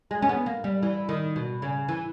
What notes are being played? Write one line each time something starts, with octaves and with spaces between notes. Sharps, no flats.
G#3
C#4
B3
A#3
G3
E3
D#3
B2
C#3
E3